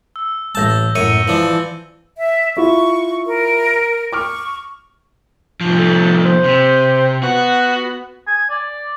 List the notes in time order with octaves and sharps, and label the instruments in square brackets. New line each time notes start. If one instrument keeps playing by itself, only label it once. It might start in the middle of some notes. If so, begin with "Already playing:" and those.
[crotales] E6
[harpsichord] A1 A5 [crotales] E6 G6 A#6
[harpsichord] F#2 C#5 [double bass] A2 [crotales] E6 C#7 D#7
[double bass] E3 [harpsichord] F3 D4
[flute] E5
[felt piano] E4 F4 E5 [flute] C#6
[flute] A#4
[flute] C#6 [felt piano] D6 F6
[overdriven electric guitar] C2 F3
[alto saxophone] A4
C5
[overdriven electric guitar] C3
[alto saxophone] B3 [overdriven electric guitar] F#4
[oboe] G#5
D5